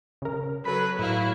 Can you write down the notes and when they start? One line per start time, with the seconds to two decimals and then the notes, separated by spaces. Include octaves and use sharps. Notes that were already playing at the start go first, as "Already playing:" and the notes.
0.22 C#3 A#4
0.65 F#3 A4 B4 B5
0.99 A2 F#3 E4 F5